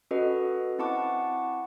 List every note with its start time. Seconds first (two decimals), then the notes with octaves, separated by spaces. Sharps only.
0.11 C#4 F#4 A4 B4 D#5
0.79 C4 E4 F#5 A5 C#6 D6